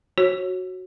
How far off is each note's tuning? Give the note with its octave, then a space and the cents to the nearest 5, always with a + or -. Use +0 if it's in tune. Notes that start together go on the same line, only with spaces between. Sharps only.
F#4 +0 C#5 -25